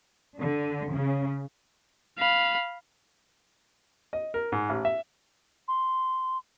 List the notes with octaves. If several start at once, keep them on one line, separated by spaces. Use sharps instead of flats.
D3
C#3
F5 B5
D#5
A#4
G#2
A1
E5
C6